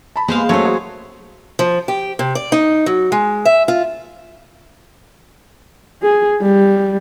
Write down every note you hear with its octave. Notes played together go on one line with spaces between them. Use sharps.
A5 B5
G#3 A#3 B3 G4 G#4 C5 F5
F#3 A3 C#4 C5 C#5
F#4 G#4
F3
G4
C3
D5
D#4
F#3
G#3
E5
F4
G#4
G3